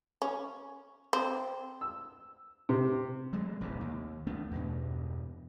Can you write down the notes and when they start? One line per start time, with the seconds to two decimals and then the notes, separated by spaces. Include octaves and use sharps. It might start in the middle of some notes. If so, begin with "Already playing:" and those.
0.22 C#4
1.13 C4
1.81 E6
2.69 C3
3.33 F#3 G#3 A3
3.60 E1 A1 F2 C3
3.81 D#2
4.27 D2 A3 B3 D4
4.51 E2 G2 B2